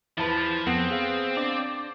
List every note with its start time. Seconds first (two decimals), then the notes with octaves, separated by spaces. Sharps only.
0.17 E2 F3 E4 B4 A5
0.67 F2 B3 C4
0.91 G#4 F5
1.37 D4 D5